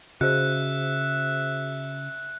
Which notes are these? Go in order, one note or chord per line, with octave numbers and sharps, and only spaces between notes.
C#3 F#4 G#4 C5 E5 F#6 C#7